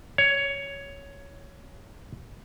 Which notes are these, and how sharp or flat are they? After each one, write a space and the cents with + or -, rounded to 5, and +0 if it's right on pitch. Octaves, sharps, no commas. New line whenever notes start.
C#5 +10